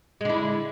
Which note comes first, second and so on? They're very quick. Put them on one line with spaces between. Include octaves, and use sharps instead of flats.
G#3 D3 E4